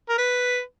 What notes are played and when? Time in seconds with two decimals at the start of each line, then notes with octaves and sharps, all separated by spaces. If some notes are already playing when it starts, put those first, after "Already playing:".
0.09 A#4
0.18 B4